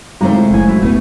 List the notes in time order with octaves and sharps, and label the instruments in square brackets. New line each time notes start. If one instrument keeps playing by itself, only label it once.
[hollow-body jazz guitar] C3 [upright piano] D#3 F4 A#5 [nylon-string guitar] G#3 A3 C5
[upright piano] E4
[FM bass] F#1 [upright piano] A2 C#3 [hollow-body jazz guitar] F3 G#5
[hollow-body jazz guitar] F#3 E4
[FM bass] D1 [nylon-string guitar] B2 B3 D#4 [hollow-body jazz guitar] A3